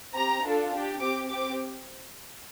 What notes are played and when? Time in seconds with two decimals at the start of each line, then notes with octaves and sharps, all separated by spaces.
0.14 C4 G4 A#5
0.43 D4 F4 A4
0.72 D4 G4
1.00 C4 G4 D6
1.29 C4 G4 D6